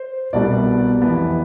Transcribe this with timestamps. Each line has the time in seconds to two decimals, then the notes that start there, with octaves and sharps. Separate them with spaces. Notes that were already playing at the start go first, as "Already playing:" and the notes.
Already playing: C5
0.33 C2 B2 G3 B3 D5
1.02 F2 E3 B3